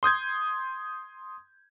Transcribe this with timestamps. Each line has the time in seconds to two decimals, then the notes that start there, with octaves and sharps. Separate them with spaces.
0.03 C6 D#6 G6 G#6